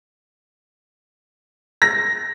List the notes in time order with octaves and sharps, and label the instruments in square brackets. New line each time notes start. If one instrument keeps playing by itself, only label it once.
[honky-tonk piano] A#6